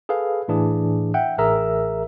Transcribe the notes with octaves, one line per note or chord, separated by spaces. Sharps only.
G#4 A4 B4 F5
A2 E3 D4 G#4
E5 F#5 G5
A1 G#4 A#4 E5 A#5 E6